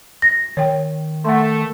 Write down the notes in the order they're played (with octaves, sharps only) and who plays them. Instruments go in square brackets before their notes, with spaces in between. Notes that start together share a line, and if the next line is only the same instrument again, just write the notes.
[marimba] A#6
[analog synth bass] D#3 [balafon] C#5 G5
[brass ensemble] A3 [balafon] F#5 C6